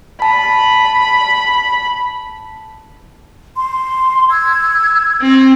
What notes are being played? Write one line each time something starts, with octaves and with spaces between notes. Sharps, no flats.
A5 B5
C6
E6 G#6
C4